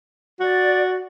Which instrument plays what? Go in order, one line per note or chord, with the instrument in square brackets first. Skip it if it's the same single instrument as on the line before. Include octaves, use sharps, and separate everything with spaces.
[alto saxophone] F#4 [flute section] D5